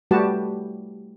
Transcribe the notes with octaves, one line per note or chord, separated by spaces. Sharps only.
G3 A3 F#4 G4 B4 A5